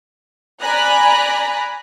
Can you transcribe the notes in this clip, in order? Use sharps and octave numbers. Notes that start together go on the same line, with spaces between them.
D5 G#5 A#5 B5 F#6